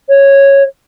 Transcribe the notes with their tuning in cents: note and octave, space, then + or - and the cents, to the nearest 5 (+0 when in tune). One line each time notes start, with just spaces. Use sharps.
C#5 -5